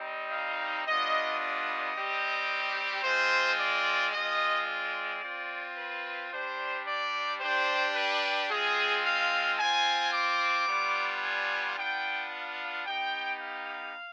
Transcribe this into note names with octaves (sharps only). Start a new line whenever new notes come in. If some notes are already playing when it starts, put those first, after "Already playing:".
Already playing: G3 C4 D#4
F5
G3 B3 D4 F4 D#5
D#5
G3 C4 G4
G#3 C4 F4 C5
D5
G#3 C4 F4 D#5
D5
C4 F4
B4
G3 D4 G4 C5
D5
G3 D4 G4 C5
B4
G#3 C4 F4 G#4
F5
C4 F4 G#5
D6
G3 B3 D4 F4
G#5
B3 D4 F4 G5
F5
B3 D#4 G4 G5
F5